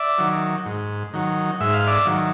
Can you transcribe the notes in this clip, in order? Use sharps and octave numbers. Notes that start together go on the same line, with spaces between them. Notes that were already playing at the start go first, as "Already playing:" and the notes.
Already playing: D5 E5
D#3 F#3
G#2
D#3 F#3
G#2 E5
F5
D5 E5
D#3 F#3